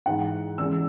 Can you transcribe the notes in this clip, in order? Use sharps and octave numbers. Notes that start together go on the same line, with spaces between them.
G#2 E3 G#3 F#5
E2 C#3 E3 G#3 E6